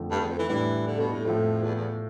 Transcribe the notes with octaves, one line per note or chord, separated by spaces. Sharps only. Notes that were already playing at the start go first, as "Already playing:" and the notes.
Already playing: F2 D3 F3 A3
G2
E2
F2
E3
A2 E3 G3 D4
D3
B2
A2
F2 A2 F3 A3
E2
E2